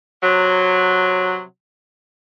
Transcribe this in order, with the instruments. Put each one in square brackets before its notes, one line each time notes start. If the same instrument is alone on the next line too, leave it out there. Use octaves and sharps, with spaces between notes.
[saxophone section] C3 F#3